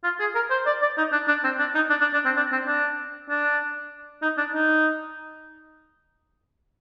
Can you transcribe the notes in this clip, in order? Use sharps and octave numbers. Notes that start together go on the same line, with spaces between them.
F4
G#4
A#4
C5
D5
D5
D#4
D4
D4
C4
D4
D#4
D4
D4
D4
C4
D4
C4
D4
D4
D#4
D4
D#4